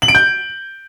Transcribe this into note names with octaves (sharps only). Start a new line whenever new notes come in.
F#7
D7
G6